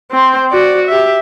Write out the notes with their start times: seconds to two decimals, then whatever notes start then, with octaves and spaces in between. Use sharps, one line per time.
0.11 C4 C5
0.51 F#4 D5
0.87 G4 E5